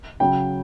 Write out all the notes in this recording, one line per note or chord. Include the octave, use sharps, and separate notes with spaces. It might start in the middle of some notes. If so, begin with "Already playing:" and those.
C#3 F#3 G5